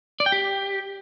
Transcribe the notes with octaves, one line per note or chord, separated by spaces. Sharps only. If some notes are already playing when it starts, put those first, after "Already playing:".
D5
G5
G4